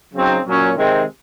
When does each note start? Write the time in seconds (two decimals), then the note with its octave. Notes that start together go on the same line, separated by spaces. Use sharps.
0.13 C#3 F#3 C4 D#4
0.45 A#2 F#3 C#4
0.76 C3 D#3 G#3 C4